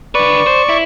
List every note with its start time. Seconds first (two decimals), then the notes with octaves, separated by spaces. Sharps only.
0.15 D3 B4 D5 C#6
0.47 C5
0.69 E4